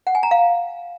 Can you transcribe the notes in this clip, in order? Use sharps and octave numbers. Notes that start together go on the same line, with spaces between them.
F#5
G#5
A#5
F5